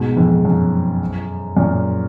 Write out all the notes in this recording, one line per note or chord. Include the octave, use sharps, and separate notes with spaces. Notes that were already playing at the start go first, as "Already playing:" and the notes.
Already playing: G#2 B2
F2 G#2
F#2
F#2 A#2